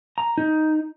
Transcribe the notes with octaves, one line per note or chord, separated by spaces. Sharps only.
A#5
D#4